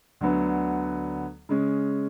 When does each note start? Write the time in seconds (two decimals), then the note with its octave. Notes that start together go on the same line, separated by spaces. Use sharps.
0.21 D2 D3 F#3 B3
1.49 C#3 G#3 C#4